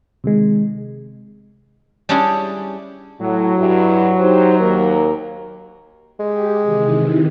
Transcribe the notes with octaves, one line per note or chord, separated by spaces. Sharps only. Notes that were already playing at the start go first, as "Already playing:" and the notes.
C3 D#3 G#3
G3 C#4 D4 E4 G4 G#4
A2 F#3
G2 E4 F#4
D#4 G4 C5
D#2 A#3 A#4
G#3 G4
C3 D#3 E3